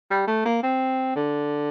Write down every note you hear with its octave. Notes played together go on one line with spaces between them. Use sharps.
G3
A3
A#3
C4
D3